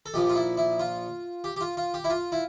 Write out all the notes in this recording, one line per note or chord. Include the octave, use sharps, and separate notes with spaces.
A4
A#1 A#2 F3 G4
F4
E4
E4
F4
G4
G4
F4
F4
G4
E4
F4
E4